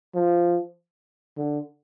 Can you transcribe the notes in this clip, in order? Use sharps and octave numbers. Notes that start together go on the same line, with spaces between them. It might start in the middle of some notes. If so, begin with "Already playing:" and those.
F3
D3